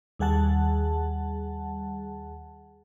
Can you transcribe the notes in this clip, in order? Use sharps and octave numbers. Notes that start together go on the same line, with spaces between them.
D#2 G3 G#4 F#5 A5